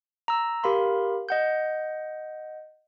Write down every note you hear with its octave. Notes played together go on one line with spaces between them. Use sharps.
A#5 E6
G4 A#4 F5 B5 C6
D#5 F#5 G6